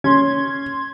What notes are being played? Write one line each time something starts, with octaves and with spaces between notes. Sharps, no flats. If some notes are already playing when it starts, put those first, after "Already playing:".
C#4 C6 G#6